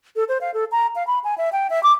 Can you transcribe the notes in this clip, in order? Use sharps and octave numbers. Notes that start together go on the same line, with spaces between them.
A4
C5
F5
A4
A#5
F5
B5
G#5
E5
G5
E5
D6